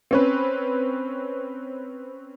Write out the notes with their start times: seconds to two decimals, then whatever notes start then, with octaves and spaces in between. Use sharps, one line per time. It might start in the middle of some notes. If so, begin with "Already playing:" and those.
0.11 C4 C#4 B4